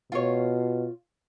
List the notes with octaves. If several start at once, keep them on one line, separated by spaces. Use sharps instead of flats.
B2 F4 C#5